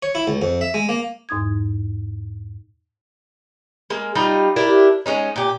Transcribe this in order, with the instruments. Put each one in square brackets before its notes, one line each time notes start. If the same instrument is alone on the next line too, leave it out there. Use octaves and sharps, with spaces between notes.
[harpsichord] C#5
E4
C#2
F2
E5
G#3
A#3
[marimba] E2 G#2 D#4 D#6 G#6
[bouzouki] G#3 A#3
G3 D#4 F4 D#5
D4 E4 G4 A#4
G#3 C#4 D#4
A#2 G4